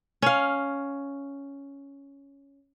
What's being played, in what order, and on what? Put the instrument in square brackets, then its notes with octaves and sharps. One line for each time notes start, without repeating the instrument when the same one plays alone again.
[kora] C#4 F5